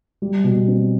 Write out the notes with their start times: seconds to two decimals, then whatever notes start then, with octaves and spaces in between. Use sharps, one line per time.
0.22 G3
0.44 B2
0.68 C4